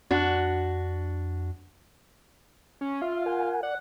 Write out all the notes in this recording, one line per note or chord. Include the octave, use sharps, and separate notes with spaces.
F2 D4 F#4
C#4
F4 E5 F5
A#4 F#5 G#5
D5 F#5